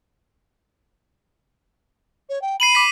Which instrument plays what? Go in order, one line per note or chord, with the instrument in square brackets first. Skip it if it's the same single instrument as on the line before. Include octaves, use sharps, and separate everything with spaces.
[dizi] C#5
G5
[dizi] B5 [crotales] C7 D#7 F#7
[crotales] D6 B6